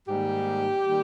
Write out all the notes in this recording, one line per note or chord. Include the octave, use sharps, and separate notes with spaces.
G#2 D#3 G3 A#3 G4
D#3 G3 A#3